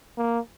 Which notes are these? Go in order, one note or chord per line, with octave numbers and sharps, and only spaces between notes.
A#3